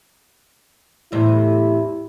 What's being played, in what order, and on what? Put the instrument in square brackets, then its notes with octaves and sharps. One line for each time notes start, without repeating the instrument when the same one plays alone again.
[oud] E2 A2 C3 [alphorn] E4